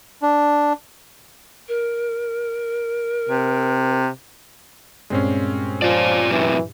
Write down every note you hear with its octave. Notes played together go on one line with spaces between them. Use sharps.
D4
A#4
C3
G2 A#2 G#3 C4 C#4 C7
F3 F4 D5
F#2 C3 E3